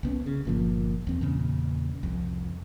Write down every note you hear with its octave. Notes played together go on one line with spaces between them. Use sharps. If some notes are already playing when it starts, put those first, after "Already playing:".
C2 B3 C#4
C#3
G1 A#2 F3
E2 C4
E2 A#2 C#3
C2 F2